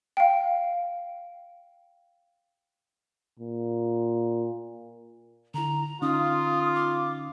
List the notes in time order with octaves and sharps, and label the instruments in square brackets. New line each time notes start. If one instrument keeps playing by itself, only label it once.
[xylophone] F5 G5
[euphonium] A#2
[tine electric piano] D3 E4 [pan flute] A#5
[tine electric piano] D3 C#4 D#4 [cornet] F4 [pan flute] D#6
[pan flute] D6